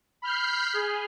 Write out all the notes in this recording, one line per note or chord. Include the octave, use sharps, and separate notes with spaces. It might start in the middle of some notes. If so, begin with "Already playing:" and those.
B5 F6 G6 C7
G#4